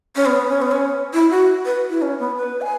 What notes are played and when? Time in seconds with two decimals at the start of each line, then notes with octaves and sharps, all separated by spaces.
0.16 C#4
0.26 B3
0.49 C#4
0.62 B3
0.72 C#4
1.14 E4
1.31 F#4
1.66 B4
1.90 E4
2.02 C#4
2.19 B3
2.37 B4
2.61 G#5